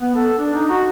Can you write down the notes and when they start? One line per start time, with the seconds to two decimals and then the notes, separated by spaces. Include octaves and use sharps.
0.01 B3
0.16 A4
0.38 D4
0.54 D#4
0.69 F#4